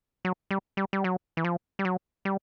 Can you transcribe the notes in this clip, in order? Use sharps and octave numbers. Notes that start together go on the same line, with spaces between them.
F#3
G3
G3
G3
F#3
E3
F3
G3
F#3
G3